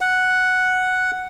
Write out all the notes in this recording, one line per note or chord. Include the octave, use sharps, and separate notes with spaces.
F#5